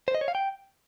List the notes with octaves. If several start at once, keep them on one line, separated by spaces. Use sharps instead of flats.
C5
D#5
C#5
F5
G5